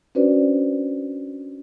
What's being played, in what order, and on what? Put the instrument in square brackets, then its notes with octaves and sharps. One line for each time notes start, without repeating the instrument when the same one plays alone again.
[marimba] C#4 D4 F#4 B4 C5 D5